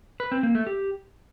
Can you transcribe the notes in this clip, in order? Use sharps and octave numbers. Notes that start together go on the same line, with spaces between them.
B4
C4
A#3
A3
G4